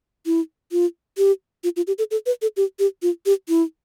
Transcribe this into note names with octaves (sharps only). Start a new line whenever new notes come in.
E4
F4
G4
F4
F4
G4
A4
A4
B4
A4
G4
G4
F4
G4
E4